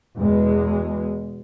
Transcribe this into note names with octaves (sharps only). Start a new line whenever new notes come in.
E2 B2 G#3